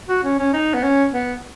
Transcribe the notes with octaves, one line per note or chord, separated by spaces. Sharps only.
F#4
C#4
C#4
D#4
B3
C#4
B3